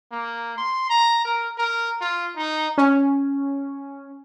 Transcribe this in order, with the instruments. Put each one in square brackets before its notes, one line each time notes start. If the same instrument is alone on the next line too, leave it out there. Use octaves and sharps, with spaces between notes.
[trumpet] A#3
C6
A#5
A#4
A#4
F4
D#4
[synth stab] C#4